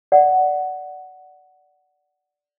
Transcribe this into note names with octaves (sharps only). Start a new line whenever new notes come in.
D5 F#5